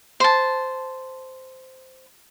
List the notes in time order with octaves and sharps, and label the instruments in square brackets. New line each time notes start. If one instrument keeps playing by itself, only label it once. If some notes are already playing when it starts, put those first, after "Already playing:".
[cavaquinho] C5 A5